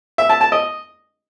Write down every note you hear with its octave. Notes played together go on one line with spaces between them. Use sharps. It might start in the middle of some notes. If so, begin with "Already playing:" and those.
E5
A5
A5
D#5